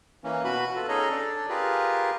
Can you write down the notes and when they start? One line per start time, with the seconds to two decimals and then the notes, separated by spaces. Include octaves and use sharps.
0.24 E3 A#3 C#4
0.44 B2 F#4 B4 B5
0.76 F4 A4 B4
0.88 C#4 D#4 G#4 A4 C#5 D#5
1.11 D4 A4 D5
1.49 F4 G4 G#4 A#4 B4